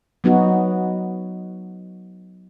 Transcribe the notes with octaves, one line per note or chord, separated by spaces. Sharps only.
F#3 B3 D#4 F#4